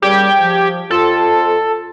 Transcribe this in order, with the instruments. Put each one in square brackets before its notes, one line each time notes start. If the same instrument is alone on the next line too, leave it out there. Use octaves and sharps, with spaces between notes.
[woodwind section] A#2 C#3 G3 [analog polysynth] G4 G5 G#6
[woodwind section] F3
[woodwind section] F2 F4 [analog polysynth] A4